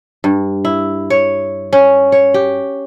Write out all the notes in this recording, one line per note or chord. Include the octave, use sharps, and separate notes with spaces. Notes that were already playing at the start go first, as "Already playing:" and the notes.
G2
E4
C#5
C#4
C#5
G4